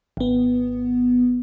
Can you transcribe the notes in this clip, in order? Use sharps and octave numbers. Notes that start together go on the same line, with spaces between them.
G#1 B3